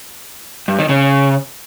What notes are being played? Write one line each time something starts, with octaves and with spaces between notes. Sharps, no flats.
G2
D#3
C#3